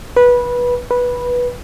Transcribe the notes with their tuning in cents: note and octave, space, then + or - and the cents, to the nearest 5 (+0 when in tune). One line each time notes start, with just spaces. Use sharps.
B4 -15
B4 -10